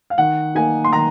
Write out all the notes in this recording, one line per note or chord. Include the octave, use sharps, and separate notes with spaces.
F5
D#3 F#5
A#3 D#4 G#5
C6
D#3 A#5